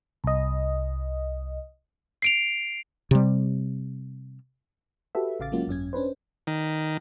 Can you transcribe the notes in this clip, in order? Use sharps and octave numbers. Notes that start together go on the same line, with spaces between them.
C2 D#5
C7 D7 F7
C3 G3
F#4 G4 A4 B4 E5
A1 C#3 F5 D6 A6
F#3 G#3 A#3 C#4 F4 F#4
G#1 F#2 C#4 G#6
C#4 D4 B4 C5
D#3